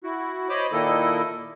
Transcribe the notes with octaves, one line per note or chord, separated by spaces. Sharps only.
E4 F#4
C5 C#5 D#5 B5 D6
A#2 D#3 A#3 E4 A4 D#5